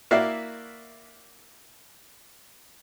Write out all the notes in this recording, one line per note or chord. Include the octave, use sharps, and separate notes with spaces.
A#3 E4 F#4 D5 E5 F5